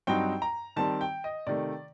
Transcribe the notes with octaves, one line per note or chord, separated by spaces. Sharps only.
G2 F#3 C4 D#4 G5
A#5
D#3 G3 C4 A5
G5
D#5
C3 D#3 A3 D5